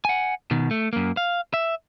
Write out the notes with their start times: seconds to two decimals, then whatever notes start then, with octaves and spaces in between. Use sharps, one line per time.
0.05 F#5 G#5
0.51 B2 D#3
0.71 A3
0.93 F#2 A#3
1.17 F5
1.54 E5